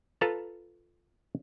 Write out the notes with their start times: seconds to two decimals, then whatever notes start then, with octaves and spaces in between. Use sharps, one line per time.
0.21 F4 A4 B4 A5 A#5